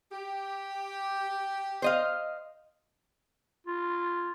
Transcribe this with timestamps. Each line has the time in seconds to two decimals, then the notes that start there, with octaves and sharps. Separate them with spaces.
0.12 G4
1.82 C5 D#5 F5
3.66 F4